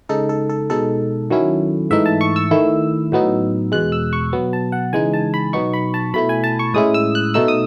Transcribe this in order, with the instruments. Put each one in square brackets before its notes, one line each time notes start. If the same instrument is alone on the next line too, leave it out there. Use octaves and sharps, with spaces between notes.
[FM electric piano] C#3 G#3 D#4 A4
A4
A4
B2 G#3 D#4 A4
D#3 F#3 C#4 E4
G#2 E3 A3 D#4 E5
A5
C#6
E6
D#3 A3 E4
A2 F#3 B3 D#4
E2 B2 G#3 F#6
E6
C#6
B2 F#3 B3
A5
F#5
C#3 E3 G#3 D#4 G#5
A5
B5
B2 F#3 B3 D#4 C#6
B5
A5
B2 A3 E4 B5
G#5
A5
C#6
A2 G#3 C#4 E4 D#6
E6
F#6
B2 A3 D#4 E6
D#6